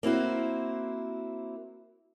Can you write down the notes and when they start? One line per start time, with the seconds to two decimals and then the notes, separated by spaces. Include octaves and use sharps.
0.03 A#3 C4 E4 F#4